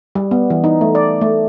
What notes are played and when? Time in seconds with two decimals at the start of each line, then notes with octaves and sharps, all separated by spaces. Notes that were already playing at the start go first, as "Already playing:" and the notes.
0.15 G3
0.31 B3
0.50 E3
0.64 D#4
0.81 A3
0.95 D5
1.21 A3